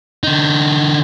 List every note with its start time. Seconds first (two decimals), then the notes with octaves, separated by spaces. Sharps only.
0.24 D3 D#4